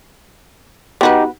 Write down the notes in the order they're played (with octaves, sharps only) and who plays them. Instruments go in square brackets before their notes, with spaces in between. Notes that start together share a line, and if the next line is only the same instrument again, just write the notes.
[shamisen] B3 F#4 B4 [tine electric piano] D#4 G4